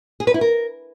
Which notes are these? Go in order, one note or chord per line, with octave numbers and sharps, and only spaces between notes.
G#4
B4
E4
A#4